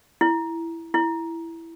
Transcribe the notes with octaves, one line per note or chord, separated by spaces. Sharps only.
E4
E4